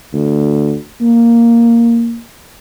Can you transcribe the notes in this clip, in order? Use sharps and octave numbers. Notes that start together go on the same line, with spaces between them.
D2
A#3